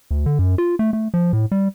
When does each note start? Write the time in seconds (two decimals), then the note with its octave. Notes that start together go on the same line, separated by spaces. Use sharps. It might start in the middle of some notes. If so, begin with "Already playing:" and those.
0.11 D2
0.26 D3
0.39 F#2
0.58 F4
0.79 A3
0.93 A3
1.14 F3
1.33 A2
1.52 G3